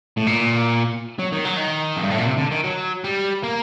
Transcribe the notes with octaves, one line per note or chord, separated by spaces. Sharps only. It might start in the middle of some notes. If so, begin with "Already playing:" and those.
A2
A#2
F#3
D#3
F#3
D#3
F#2
G2
A2
A#2
C3
D3
D#3
F#3
G3
A#3